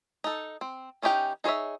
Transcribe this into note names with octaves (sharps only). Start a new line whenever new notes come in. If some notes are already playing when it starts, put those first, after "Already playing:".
D#4 A4
C4
E3 C#4 D#4 G4 G5
D#4 G#4 C5 C#5 E5